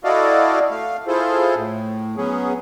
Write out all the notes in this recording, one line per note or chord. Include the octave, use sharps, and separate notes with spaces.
E4 F#4 A4 D5 D#5 F5
A3 F5
E4 F4 G#4 A4 C5
A2
F#3 B3 C#4 G#4